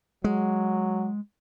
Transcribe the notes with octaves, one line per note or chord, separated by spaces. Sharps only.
F#3 G#3